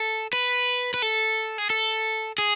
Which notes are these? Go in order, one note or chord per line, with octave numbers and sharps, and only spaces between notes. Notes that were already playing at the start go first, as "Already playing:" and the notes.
Already playing: A4
B4
B4
A4
G#4
A4
G#4